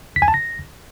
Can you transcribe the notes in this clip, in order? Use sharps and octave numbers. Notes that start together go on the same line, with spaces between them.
B6
G#5
A5
A#6